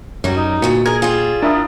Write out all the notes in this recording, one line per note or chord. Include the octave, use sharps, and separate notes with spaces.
F#2 F#3 G3
D#4
D2 A#2 F#3 A3 C#7
G#4 A#4 D#5 G#6
G3 F4 G#4
D4 E4 A#4 D#6